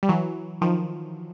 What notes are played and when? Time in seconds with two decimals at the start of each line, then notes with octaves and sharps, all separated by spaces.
0.03 G3
0.09 E3 F#3
0.62 D#3 F3